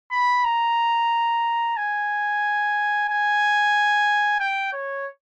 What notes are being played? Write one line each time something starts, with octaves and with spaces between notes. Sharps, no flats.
B5
A#5
G#5
G#5
G5
C#5